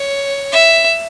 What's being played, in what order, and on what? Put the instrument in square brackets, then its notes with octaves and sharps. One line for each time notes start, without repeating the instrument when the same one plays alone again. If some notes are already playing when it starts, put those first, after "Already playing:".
Already playing: [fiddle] C#5
E5